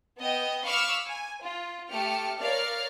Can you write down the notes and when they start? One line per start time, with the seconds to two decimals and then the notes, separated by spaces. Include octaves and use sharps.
0.20 B3 D#5 G5
0.65 F5 B5 C#6 D6 E6 F6
1.07 G#5
1.42 F4
1.91 A3 G4 F6 C#7
2.41 A#4 C#5 D5 F5 F6